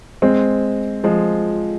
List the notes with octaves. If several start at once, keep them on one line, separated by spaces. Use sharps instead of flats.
G#3 C4
F3 G#3